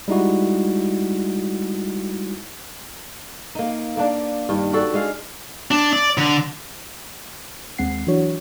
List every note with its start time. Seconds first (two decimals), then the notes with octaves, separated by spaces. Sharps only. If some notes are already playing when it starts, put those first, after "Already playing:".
0.08 G3 G#3 D#4 E4 F#4
3.55 A#3 D#4
3.97 A#3 D4
4.49 G2 D#3
4.73 D4 F#4 G4 A4
4.94 G#3 G#4 F5
5.71 D4
5.93 D5
6.18 D3
7.78 D#2 G#3 C4 F#5 C7
8.07 E3 F#3 D4 F#4 C#5